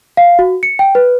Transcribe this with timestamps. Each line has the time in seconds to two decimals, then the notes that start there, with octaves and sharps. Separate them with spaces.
0.17 F5
0.39 F#4
0.63 C#7
0.79 G5
0.95 B4